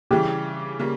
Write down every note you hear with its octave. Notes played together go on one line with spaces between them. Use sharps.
C#3 E3 G3 G4
C#3 G3 A#3